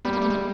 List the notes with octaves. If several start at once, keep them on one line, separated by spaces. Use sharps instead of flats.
G3 B3
A#3
A3
G#3